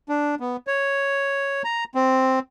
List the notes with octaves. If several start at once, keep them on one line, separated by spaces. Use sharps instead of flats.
D4
B3
C#5
A#5
C4